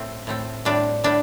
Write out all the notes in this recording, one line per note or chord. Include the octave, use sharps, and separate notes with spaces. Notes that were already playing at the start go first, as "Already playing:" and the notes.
Already playing: A2 A3 C4
A2 A3 C4
A2 G3 C4 D4
A2 G3 D4